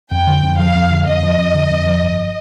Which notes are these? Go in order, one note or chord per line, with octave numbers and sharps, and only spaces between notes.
F2 G5
D3
F2
F3 F5
F2
D3
F2 D#5
F3
F2
D3
F2
F3
G1